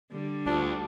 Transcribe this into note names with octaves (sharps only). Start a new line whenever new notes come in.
D3 G3
D2 D4 F4